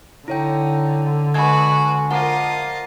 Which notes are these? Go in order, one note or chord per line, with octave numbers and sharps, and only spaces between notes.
D3 D#4 E4 C#5 G5
G#3 F#4 B4 B5 G#6
F3 A#3 F4 D#5 F#5